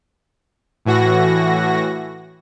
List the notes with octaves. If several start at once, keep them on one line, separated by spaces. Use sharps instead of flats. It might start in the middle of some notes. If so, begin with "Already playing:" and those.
A2 E3 F#4 A#6